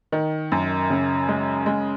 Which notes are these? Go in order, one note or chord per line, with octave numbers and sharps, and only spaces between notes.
D#3
F#2
C#3
G#3
G#3